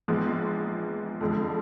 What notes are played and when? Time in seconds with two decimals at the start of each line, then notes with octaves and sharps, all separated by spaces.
0.08 A#1 G#2 F3 G#3 B3
1.21 F2 D3 F3 G#3